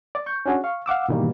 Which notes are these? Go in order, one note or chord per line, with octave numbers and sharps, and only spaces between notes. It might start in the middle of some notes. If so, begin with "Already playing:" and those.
D5
C#6 G6
C#4 D4 F#4 G#4
F5 C#6
F5 F#5 D6 E6
G#2 B2 D#3 E3 G3 A#3